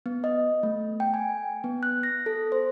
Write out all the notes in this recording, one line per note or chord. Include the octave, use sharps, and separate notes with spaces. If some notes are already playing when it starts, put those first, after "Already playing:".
B3
D#5
A3
G5
G#5
B3
F#6
A#6
A4
C5